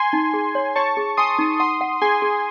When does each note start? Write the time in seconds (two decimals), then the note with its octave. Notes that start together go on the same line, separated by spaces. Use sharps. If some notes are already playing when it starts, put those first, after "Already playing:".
Already playing: G#5 C6
0.13 D#4
0.34 G#4
0.55 C#5
0.75 C#5 A5 C#6
0.97 G#4
1.17 G#5 C6 D#6
1.39 D#4
1.60 F#5 C6 D#6
1.81 F#5
2.01 G#4 G#5 C6
2.22 G#4